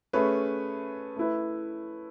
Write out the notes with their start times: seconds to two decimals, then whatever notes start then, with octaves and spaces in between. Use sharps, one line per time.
0.13 A3 C#4 G#4 B4
1.16 A3 E4 B4